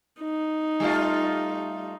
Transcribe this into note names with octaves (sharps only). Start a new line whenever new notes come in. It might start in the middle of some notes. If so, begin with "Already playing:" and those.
D#4
G3 A3 F4